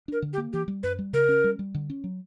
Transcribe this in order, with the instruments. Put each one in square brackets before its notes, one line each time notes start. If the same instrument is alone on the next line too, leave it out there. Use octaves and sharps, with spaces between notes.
[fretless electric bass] D4 [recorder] A#4
[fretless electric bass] D3
[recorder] G4
[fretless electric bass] A#3
[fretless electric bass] E3 [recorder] G4
[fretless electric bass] G3
[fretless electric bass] F#2 [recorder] B4
[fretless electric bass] G3
[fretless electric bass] C#3 [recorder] A#4
[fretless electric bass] C#4
G3
G3
D3
C#4
F#3